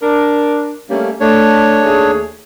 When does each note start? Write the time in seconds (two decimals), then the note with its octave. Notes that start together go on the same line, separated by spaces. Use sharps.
0.02 D4 A#4
0.89 G3 A3 A#3 C#4
1.20 A3 D4 C#5
1.82 D#2 A3 G#4